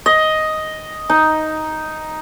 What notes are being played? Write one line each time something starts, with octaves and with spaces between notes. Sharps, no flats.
D#5
D#4